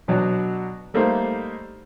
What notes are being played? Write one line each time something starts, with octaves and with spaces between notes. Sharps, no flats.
B2 F#3 D4
G3 A3 A#3 D#4 C5